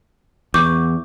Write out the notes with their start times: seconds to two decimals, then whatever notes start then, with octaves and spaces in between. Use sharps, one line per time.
0.54 E2 C#6 D6 G6